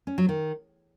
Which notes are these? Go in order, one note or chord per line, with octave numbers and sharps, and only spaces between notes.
C#4
F#3
D#3